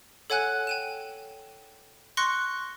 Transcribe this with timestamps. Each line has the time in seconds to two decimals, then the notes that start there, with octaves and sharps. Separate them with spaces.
0.30 A4 C#5 F#5 G#5 F#6
0.67 G5 D#7 E7
2.17 C6 C#6 F#6 A#6 C#7